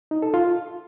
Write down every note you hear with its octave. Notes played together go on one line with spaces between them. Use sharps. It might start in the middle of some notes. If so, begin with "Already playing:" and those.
D#4
A4
F4